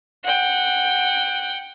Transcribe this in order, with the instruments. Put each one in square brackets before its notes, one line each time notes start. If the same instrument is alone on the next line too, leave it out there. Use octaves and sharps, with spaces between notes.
[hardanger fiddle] F#5 G5